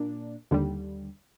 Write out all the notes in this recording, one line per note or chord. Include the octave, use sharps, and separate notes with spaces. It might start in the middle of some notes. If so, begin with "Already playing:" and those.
Already playing: A#2 A#3 D4
D#2 D3 G3